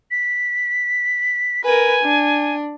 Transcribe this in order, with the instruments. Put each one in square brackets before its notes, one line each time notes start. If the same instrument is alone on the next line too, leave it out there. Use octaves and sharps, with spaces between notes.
[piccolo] B6
[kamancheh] A#4 B4 [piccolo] G#5
[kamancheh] D4